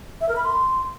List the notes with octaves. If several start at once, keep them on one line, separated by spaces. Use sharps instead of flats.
E5
A#4
B5
C6